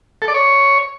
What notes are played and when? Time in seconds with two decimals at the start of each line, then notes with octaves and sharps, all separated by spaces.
0.22 A4
0.28 D5
0.34 C#5